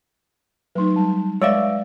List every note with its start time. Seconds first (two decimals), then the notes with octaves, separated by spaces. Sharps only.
0.75 F#3 A3 D#4 B4 C6
0.96 G3 A5
1.42 G#3 B4 C#5 D5 E5 F5 E6